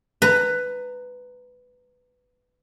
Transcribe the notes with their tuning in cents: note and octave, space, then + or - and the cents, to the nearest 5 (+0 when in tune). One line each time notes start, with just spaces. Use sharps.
B4 +10 A#5 -20